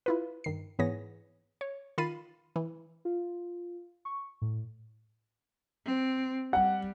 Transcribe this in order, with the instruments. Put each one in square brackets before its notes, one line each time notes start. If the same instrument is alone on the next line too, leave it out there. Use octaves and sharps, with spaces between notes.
[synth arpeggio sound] E4 F4 B4
G2 D#3 C7
G#2 E3 B3 G#4 C#5 A#6
C#5
D#3 F4 B5 A6 C7 D#7
E3
[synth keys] F4
C#6
A2
[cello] C4
[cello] G3 [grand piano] F#5